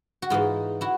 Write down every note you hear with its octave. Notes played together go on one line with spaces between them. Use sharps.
F#4
G#2 E3 D#4 F4
E4 F#4